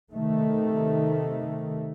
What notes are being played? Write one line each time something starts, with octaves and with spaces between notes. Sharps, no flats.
C3 D#3 A3